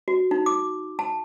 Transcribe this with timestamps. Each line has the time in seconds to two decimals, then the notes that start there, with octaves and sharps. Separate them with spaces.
0.08 F#4
0.31 D#4
0.46 D6
0.99 A5